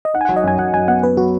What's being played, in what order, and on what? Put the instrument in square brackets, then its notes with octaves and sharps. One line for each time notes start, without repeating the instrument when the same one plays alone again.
[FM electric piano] D#5
[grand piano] D#4 [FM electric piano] F#5
[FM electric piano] G#5
[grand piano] F#3 [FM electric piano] F#5
[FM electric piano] D#5
[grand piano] F#2 [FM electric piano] G#5
[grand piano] F#2 [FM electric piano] F#5
[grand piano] F#2 [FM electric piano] G#5
[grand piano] B3 [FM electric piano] F#5
[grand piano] B3 [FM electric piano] B4
[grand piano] F#3 [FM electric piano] F#4